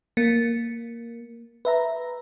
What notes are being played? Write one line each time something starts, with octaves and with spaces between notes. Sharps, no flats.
A#3
B4 E5 A#5